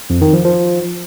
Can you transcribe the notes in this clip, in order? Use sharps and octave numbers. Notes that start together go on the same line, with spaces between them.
F2
D#3
F3
F3